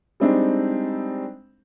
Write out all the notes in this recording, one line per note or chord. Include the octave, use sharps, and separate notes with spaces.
G3 G#3 C4 D4 D#4